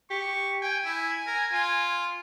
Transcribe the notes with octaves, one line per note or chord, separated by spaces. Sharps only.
G4 C#6
G5 G#5
E4
A#4
F4